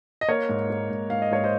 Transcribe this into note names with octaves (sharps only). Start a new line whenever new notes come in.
D#5
A#3 A#4 C#5
G#2
A#3
G#2
G#2 F5
D#5
G#2 C#5
C5 D#5